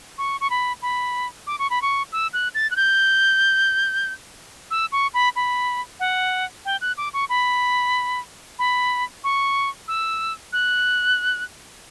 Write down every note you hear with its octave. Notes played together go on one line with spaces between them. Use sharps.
C#6
C#6
B5
B5
D6
C#6
B5
C#6
E6
F#6
A6
F#6
G6
E6
C#6
B5
B5
F#5
G5
F#6
D6
C#6
B5
B5
C#6
E6
F#6